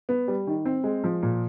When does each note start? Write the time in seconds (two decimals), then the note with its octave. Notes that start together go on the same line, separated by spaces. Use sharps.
0.09 B3
0.28 G3
0.47 D#3
0.65 C4
0.84 G#3
1.04 F3
1.23 A#2